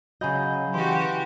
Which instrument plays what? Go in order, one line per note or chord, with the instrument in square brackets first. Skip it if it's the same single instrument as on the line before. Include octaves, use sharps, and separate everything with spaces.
[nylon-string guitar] C#3 D#5 [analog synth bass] F#3 [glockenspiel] G#5 B5 G6
[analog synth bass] E3 [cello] F#4 G4 [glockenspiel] C6